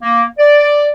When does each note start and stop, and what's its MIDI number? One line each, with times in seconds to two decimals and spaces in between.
0.02 0.25 58
0.39 0.90 74